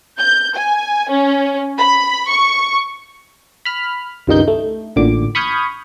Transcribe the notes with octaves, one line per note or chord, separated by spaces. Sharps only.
G6
G#5
C#4
B5
C#6
B5 F6
C#2 G2 D#3 D#4 G6
A3
A1 A#2 D3 D6
B5 C#6 D#6 F6 G6 G#6